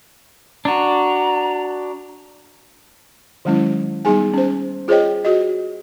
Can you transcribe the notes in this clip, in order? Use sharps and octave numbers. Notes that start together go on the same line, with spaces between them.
D4 F#4 A#5
D#3 F#3 G#3 C#4 E4
G3 B3 D#4 G#4 G#5
C#4 C5
F4 G#4 C5 C#5 D#5 G5
F#4 G#4 D#5